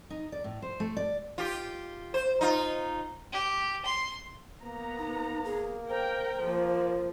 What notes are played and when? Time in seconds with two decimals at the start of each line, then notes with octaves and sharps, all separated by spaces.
0.10 D#4
0.32 D5
0.44 A2
0.62 C5
0.80 A3
0.97 D5
1.38 F4 G4
2.14 C5
2.41 D#4 F4
3.32 G4
3.84 C6
4.64 A#3 B3 A#5
4.99 D#4
5.45 G#4
5.89 A#4 C5 G5
6.47 F3 A#3